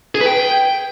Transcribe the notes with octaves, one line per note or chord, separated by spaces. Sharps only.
G#4
B4
G5